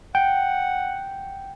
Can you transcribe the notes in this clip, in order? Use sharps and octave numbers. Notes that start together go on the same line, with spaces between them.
F#5 G5